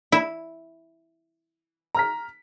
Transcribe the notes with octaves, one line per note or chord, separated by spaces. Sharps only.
E4
A#5 F6 B6